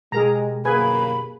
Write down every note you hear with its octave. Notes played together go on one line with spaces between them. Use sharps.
B2 G#3 G4 G#4 A#4 A#5
G1 F#2 A#3 G#4 B4 G#5 B5